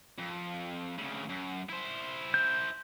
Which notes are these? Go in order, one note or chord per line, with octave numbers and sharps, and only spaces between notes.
F2
D2 C#3
F#2
E4 C5
G6